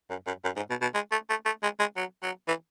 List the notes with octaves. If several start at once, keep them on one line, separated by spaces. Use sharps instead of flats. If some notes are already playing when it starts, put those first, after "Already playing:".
F#2
F#2
F#2
G#2
B2
B2
G#3
A3
A3
A3
G#3
G#3
F#3
F#3
E3